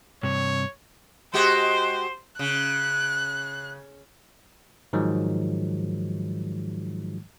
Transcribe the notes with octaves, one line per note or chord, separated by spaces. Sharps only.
G2 C3 C#5
G#3 F#4 G4 C5
C#3 F#6
G#2 D#3 F3 F#3 G#3